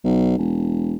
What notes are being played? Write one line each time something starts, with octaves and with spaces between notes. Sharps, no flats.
B1
E1